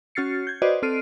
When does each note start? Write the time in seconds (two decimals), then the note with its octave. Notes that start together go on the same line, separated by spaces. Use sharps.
0.15 C#4 F#4 F6 A6 C7 C#7
0.47 G6 G#6
0.62 F#4 B4 C5 D5 D#5
0.82 C4 A4 F6 C7 D7 D#7